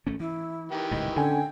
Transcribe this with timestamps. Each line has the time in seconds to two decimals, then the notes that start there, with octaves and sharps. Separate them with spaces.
0.07 G#1 A3 C#4
0.20 E3 E4
0.71 D#3 E3 G4
0.91 D#1 C#2 A2 D#5
1.16 D3 C#4 G5 G#5